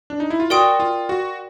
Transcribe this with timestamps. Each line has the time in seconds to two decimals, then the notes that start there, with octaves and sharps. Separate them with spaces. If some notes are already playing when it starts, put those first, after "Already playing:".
0.10 D4
0.20 D#4
0.30 E4
0.40 F4
0.50 F#4 A#4 D5 G5 C6 D#6
0.80 F4
1.09 F#4